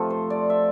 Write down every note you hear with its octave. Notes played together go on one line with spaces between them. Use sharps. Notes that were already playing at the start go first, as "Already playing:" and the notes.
Already playing: C3 F3 A3 A4
C5
D5
E5